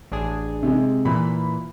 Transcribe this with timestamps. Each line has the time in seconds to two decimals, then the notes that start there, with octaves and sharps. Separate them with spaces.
0.12 A1 D4 G#4
0.63 C3 G#3
1.05 A#2 E3 B5